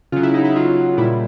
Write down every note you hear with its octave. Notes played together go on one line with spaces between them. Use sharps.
C#3 F#3 F4
E4
D#4
E4
C#3 F#3 F4
A#2 G3 E4